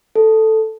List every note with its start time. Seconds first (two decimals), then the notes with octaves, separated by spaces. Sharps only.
0.16 A4